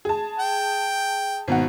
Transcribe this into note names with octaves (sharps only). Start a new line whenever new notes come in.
G#4 A5
G5
G#1 B2 F#5